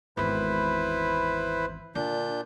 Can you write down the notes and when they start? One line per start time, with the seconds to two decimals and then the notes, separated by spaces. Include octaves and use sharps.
0.17 G#1 E2 E4 B4 C5
1.95 A#2 D3 D4 G6